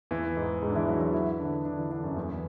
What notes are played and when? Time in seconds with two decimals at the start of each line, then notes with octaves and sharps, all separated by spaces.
0.11 E2 E3
0.37 G#2 G#3
0.62 G#2 G#3
0.70 D4
0.75 E3 E4
0.88 F#3 F#4
1.01 E3 E4
1.14 E3 E4
1.40 D3 D4
1.65 D3 D4
1.78 E3 E4
1.91 D3 D4
2.04 F#2 F#3
2.17 E2 E3